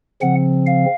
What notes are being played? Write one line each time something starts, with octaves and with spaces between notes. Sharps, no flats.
C#3 F3 C4 F#5
F5